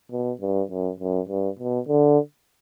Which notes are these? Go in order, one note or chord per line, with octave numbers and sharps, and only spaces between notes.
B2
G2
F#2
F#2
G2
B2
D3